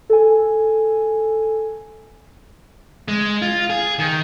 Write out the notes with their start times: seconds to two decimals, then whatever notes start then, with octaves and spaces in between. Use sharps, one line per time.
0.10 A4 G#5
3.08 G#3
3.42 F4
3.70 G#4
3.99 D#3